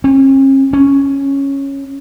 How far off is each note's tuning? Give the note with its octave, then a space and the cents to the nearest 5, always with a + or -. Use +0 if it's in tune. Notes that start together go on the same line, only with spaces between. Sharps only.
C#4 -45
C#4 -5